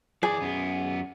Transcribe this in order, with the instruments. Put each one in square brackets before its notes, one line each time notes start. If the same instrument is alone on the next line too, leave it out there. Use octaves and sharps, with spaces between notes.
[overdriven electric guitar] E3 D5 [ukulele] G#4
[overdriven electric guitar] F#2 B3